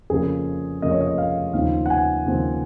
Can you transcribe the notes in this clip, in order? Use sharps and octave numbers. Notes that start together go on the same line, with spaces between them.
F2 C#3 F3 A#3 C#4 G#4
F2 C#3 F3 A#3 C#4 D#5
C#5
D#5
F5
D#2 C#3 F3 C4 D#4 F5
F#5
G#5
D#2 C#3 F3 C4 D#4